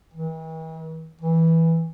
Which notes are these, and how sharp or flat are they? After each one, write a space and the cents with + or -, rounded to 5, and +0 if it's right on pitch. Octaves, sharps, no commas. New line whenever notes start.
E3 -45
E3 -10